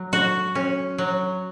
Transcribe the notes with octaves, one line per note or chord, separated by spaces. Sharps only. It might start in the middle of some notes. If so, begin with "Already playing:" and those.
Already playing: F#3
F#4
C#4
F#3